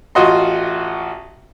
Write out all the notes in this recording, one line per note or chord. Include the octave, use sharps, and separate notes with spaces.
A1 F4 F#4 D#5 C6